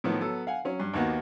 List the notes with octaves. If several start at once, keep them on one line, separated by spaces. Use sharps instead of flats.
A2 D#3 F3 B3
F#3 B3 A4
F5 F#5 G#5
F#3 C#4
G2
D#2 D#3 A#3 B3 F#4